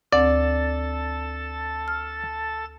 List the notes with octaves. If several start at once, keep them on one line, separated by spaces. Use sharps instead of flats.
D2 C4 A4 D5 A5 A6
F6